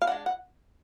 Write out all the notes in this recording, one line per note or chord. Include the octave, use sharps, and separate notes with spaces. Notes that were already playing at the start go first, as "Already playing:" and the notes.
F5
G#3 D4 F#5
F#5